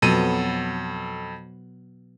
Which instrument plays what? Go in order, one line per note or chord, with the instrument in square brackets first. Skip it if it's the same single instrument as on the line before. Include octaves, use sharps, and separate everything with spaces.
[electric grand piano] F2 A4 D#7 [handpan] B2 F#3 B3